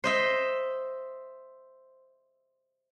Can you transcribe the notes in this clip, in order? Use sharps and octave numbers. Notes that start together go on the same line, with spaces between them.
C5 D#5 E5